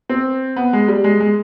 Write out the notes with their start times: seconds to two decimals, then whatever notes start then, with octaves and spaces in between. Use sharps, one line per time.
0.09 C4
0.56 B3
0.73 G#3
0.88 G3
1.04 G#3
1.20 G#3